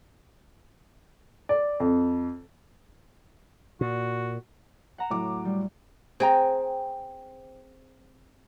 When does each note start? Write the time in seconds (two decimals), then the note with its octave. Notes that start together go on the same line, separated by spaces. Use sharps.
1.49 D5
1.80 F2
3.81 A#2 F#4
4.98 F#5 A#5 E7
5.10 A2 F#3 D6
5.45 G3
6.20 C4 G#4 G5 A#5